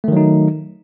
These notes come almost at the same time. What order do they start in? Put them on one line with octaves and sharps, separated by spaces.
A3 D#3 F#3 D#4